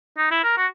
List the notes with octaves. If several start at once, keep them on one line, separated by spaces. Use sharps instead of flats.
D#4
E4
A#4
F#4